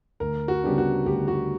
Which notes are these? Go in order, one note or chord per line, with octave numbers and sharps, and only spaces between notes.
D2 A#4
F#4
C#3 G3 B3 D4 G4
F#4
D2 G4
F#4